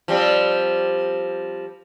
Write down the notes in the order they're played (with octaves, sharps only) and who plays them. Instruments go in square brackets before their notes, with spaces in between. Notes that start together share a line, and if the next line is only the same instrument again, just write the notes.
[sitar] F3 G3 C4